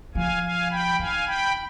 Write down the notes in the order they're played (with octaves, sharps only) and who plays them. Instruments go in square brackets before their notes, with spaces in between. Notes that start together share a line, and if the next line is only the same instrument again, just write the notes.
[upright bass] F3 [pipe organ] F5 G#5
[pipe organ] F5 G#5
G5 B5
[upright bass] D#3 [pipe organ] F5 G#5
[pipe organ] G5 B5